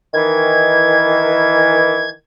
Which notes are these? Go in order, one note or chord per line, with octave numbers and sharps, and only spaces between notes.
D#3 E3 G#6